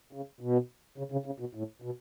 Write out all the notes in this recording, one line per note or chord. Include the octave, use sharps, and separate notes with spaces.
C#3
B2
C#3
C#3
C#3
B2
A2
B2